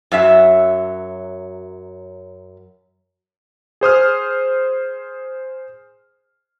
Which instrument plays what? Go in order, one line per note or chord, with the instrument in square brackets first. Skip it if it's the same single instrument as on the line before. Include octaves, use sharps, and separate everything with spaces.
[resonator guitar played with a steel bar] F#2 F#3 E5
[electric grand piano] G#4 C5 D#6 F6